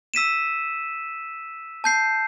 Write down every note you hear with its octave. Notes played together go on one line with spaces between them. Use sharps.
E6 B6 D#7 E7
A5 G6 C7